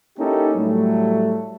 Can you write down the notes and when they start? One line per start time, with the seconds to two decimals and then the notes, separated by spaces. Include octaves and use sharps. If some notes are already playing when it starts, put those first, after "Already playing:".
0.19 A#3 C#4 D#4 E4 G4 A4
0.56 A2 F#3 G3 A3